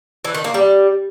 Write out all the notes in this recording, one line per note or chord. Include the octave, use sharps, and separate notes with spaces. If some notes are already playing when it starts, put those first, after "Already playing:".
E3
D#3
A#3
G3